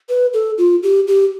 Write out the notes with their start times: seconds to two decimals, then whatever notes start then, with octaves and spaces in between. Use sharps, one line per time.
0.09 B4
0.33 A4
0.58 F4
0.83 G4
1.07 G4